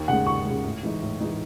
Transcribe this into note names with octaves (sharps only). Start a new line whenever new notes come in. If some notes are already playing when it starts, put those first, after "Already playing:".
Already playing: D#2
C#3 G#3 F#5
D#2 C#6
G#3
C#3
A2
E3 G#3 D#4
A2
E3 G#3 D#4